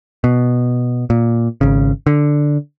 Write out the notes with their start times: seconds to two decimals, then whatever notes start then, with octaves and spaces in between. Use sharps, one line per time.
0.24 B2
1.10 A#2
1.61 G#1 C#3
2.07 D3